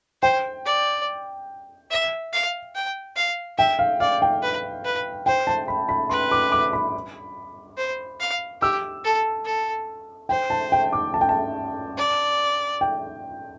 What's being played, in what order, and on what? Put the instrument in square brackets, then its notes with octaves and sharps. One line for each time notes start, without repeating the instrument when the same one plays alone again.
[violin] C5 [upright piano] G5
[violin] D5
E5
F5
G5
F5
[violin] E5 [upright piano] G5
[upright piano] F5
[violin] D5 [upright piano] F5
[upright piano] G5
[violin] B4
B4
[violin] C5 [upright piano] G5
[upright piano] A5
B5
B5
[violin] B4 [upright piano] C6
[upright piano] D6
D6
B5
[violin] C5
F5
[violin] G4 [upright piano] E6
[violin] A4
A4
[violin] C5 [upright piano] G5
[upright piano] A5
G5
D6
A5
G5
A5
[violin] D5
[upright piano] G5